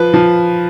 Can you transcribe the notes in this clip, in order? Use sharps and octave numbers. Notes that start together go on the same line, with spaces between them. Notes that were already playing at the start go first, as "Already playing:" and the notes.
Already playing: F3 B4
F3